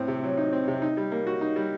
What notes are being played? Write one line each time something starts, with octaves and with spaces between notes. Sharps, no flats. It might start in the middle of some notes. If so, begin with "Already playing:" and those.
Already playing: A2 C4
C3
F#3
D#4
C4
C3
D#4
G3
A#3
F#4
D#4
G3